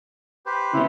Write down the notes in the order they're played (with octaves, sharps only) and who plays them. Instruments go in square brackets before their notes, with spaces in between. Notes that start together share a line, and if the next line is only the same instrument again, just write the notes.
[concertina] G4 B4 C5
[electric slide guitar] C#3 B3 [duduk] E4